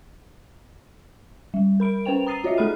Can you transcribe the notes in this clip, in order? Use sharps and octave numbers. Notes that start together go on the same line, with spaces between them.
G3
A#4 B5 D7
C#4 B4 C5 G5 F7
A#5 D#6 A6 C7 D#7
F4 F#4 C#5 D#5 E5
A3 G#4 A4 B5 F6 D#7